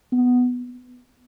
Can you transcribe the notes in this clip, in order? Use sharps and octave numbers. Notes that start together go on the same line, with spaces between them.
B3